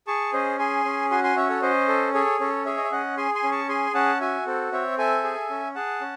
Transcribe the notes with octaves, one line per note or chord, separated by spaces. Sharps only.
G#4 A5 C#6
C#4 C5 D#5
G#4 G#5 C6
C#4
F#4 G#5 C6
G#5 C6
C#4 C#5 E5
A4 C#5
C#4 C5 D#5
A4
G#4 A4 C#5
C#4 A4 C#5
G#4 C#5 E5
D#5
E5
C#4 D#5 F#5
G#4 G#5 C6
G#5 C6
C#4
A5 C#6
G#4 G#5 C6
C#4 F#5 A5
F#4 E5 G#5
C4 A4
C4 C#5 E5
A4 E5 G#5
G#4
C#4
G#4 F#5 A5
C#4